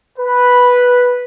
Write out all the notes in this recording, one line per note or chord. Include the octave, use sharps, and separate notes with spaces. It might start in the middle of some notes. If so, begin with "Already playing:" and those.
B4